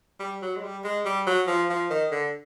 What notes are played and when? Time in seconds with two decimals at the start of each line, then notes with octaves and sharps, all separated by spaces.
0.20 G3
0.42 F#3
0.56 G#3
0.63 G3
0.84 G#3
1.05 G3
1.27 F#3
1.47 F3
1.70 F3
1.90 D#3
2.11 D3